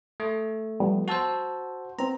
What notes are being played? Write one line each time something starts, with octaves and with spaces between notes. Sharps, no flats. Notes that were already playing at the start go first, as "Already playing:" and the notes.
A3
F3 G3 B3
F#4 C5 F#5 A5 E6
B3 C4 A#5